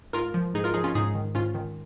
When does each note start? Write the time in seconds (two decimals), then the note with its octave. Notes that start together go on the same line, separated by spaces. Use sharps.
0.13 G#2 F4 A#4
0.34 F3
0.54 G#2 D#4 G#4
0.64 F4 A#4
0.74 F3 D#4 G#4
0.84 C#4 F4
0.95 G#2 D#4 G#4
1.15 D#3
1.35 G#2 C#4 F4
1.55 D#3